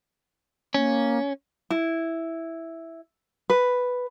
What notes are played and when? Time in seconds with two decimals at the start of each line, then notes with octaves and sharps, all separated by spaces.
0.74 A#3 C#4
1.70 E4
3.50 B4